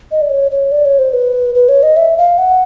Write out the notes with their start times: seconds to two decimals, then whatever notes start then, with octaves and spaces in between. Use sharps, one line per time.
0.12 D#5
0.21 D5
0.30 C#5
0.51 C#5
0.72 D5
0.85 C#5
0.99 C5
1.13 B4
1.55 B4
1.69 C#5
1.83 D#5
1.97 E5
2.18 F5
2.38 F#5